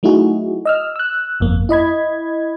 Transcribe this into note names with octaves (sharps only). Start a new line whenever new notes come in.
F#3 A3 D#4 E4 F#4 G#4
D#5 E6 F6
E6 F#6
G1 F2 A#3
E4 D#5 B5 G#6